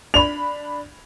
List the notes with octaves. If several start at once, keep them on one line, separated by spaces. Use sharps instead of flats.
D4 B5 F7